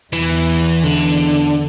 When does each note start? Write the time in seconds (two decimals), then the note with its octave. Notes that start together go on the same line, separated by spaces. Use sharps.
0.13 E2 E3
0.84 D3